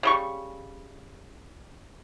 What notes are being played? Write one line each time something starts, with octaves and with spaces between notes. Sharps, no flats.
C#3 G3 C#6